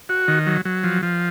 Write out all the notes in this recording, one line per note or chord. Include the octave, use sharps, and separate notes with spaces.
F#4
D#3
F#3
F#3
F3
F3